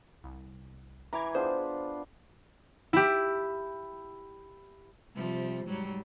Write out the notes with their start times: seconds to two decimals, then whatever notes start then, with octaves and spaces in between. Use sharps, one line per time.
0.24 C2
1.13 E3 A#5 B5 D6 G#6
1.34 B3 D4 F4 G#4 C5
2.93 E4 G4
5.15 C3 F3 G3
5.66 G#2 F#3 G3